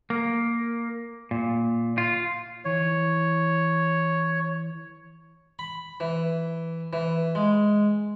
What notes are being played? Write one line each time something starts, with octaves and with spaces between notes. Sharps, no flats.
A#3
A#2
F4
E3 C#5
B5
E3
E3
G#3